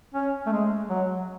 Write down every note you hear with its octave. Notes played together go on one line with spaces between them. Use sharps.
C#4
A3
G#3
F#3